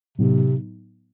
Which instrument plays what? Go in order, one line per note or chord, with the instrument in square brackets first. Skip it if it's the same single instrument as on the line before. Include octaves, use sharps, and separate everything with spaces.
[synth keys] A2 F#3 B3 D#4 [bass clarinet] C3